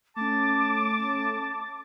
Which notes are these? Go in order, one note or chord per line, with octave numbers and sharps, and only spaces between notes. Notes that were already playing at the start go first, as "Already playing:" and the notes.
A3 C#4 A5 D6